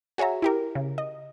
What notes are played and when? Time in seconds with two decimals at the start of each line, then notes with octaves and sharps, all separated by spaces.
0.18 F#4 G#4 C#5 E5 A#5
0.42 E4 G4 A#4
0.75 C#3
0.98 D#5